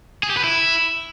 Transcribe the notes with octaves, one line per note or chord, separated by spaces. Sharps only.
G#4
G4
B4
E4